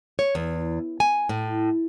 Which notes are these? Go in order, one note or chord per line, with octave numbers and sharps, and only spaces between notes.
C#5
E2
G#5
A2